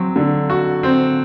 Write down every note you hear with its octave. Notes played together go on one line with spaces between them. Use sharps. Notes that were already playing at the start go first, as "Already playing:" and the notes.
Already playing: F#3 C4
D3
F#4
C4